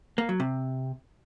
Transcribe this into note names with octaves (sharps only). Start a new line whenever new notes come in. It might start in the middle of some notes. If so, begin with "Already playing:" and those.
A#3
F#3
C3